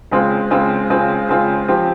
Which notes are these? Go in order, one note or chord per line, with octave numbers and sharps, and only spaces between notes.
C#3 G#3 C4 F4
C#3 G#3 C4 F4
C#3 G#3 C4 F4
C#3 G#3 C4 F4
F3 C4 G4